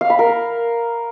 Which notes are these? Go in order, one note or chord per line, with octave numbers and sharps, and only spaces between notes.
F5
B5
A#4